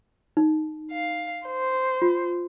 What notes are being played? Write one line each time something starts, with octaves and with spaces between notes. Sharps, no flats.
D#4
F5
C5
F4